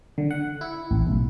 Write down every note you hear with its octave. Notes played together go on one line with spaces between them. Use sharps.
D3
F#5
E4
A1
B1